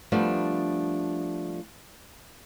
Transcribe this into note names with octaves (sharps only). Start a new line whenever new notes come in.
F3 G3 A3 B3 D4